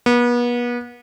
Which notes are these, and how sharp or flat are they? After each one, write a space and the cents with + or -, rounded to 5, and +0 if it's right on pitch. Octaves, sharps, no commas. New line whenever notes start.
B3 -35